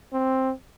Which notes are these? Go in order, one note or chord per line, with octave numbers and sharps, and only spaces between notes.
C4